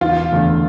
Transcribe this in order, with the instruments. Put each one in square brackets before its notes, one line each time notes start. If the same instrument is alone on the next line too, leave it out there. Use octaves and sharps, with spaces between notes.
[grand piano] E1 [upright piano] F4
[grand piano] E2 D3 A3